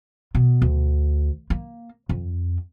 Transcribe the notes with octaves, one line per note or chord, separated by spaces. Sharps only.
B2
D2
A#3
F2